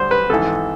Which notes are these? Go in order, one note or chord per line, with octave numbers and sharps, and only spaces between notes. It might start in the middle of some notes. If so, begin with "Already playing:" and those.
Already playing: D2 D3 G3 C5
B4
G#1 G#2 E3 A4